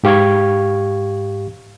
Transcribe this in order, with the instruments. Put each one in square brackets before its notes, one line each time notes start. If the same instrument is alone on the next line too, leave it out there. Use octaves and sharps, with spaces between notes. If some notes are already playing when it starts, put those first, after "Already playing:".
[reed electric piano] G#2 G4 F5 C#6 G#6